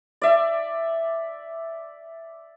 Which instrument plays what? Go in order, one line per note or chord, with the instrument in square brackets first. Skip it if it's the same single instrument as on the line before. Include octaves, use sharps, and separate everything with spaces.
[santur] D5 E5